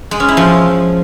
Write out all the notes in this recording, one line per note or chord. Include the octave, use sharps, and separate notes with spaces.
G#3
C#4
E4
F3